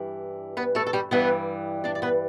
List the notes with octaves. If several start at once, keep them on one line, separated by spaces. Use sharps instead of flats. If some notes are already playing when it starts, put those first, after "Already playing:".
Already playing: G2 E3 G3
B3 B4
A3 A4
A4
G3 G4
G2 E3 G3 B3 B4
D4 D5
D5
B3 B4